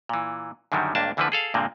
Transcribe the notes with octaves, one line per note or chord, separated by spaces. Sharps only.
A#2 E3
F#2 D3 D#3 F#3 G3
C#2 G2 A#3 D4 A5
D2 D3 E3 F3 D4 B4
G#4 A4 F5
G2 A#2 D3 G#3 A#3 C4